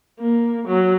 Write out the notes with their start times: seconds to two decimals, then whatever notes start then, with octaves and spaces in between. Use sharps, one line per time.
0.20 A#3
0.67 F#3